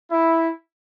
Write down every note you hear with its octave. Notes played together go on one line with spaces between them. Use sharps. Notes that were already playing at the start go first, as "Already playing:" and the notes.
E4